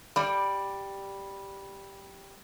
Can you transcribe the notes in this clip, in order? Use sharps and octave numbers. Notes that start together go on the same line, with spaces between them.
G3 D5